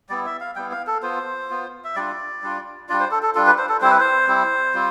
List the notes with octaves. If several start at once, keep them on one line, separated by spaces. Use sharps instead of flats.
G3 B3 E4 D5
E5
F5
G3 B3 E4 G5
F5
A4
B3 F4 C5
B3 F4
E5
G3 D4 F4 D5
G3 D4 F4
G3 D4 F4 D5
C5
A4
A4
G3 D4 F4 A4
B4
C5
A4
G3 C4 E4 C5
B4
C5
G3 C4 E4
G3 C4 F4